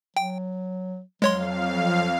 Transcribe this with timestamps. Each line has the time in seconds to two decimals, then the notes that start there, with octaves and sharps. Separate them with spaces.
0.16 F#3 G5
1.22 F2 F#3 G#3 C#5 F5 C6